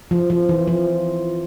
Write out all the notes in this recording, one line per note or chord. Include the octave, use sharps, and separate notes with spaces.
F3
F3
E3
F3